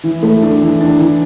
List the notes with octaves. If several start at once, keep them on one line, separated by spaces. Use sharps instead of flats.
E3
A3
D4
E3
D4
E3